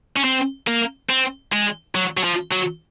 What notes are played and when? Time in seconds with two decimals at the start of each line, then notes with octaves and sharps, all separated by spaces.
0.17 C#4
0.24 C4
0.67 A#3
1.10 C4
1.53 G#3
1.95 F#3
2.17 F#3
2.24 F3
2.52 F#3